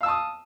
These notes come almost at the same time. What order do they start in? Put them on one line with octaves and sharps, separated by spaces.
F5 E6 A5 D#6